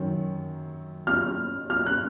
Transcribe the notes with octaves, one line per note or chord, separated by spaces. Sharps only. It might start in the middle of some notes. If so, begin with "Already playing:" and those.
Already playing: F#2 D#3 F#3
F6
F6
F#6